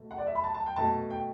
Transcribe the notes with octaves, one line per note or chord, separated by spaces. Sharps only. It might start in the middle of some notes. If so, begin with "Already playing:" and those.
Already playing: B2 A3
F#5
D5
E5
B5
A5
A5
G5
B2 A3 A5
G5